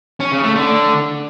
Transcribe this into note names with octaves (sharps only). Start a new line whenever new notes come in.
C#4
C#3
A3
D3